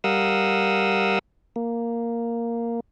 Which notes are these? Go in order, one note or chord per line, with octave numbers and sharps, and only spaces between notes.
G3 A#4 F5 F#5 D#6 E6
A#3